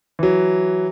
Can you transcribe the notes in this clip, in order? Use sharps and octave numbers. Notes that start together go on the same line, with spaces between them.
E3 F#3